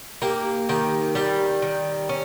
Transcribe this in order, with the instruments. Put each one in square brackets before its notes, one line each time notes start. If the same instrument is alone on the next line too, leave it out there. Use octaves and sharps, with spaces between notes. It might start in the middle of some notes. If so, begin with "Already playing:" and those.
[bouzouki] A#3 [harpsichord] D#4 G4
[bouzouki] D#3 [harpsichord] D#4 G4
[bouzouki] G3 [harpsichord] D#4 G4
[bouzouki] D#3
C#4